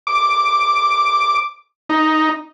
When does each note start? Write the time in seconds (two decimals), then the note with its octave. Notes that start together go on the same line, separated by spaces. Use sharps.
0.07 D6
1.89 D#4